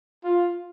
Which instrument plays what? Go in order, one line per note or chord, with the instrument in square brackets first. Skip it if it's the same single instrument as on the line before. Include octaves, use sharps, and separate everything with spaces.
[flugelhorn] F4